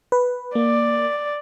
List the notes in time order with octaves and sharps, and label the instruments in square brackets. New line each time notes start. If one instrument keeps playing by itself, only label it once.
[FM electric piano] B4
[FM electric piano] A#3 [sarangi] D5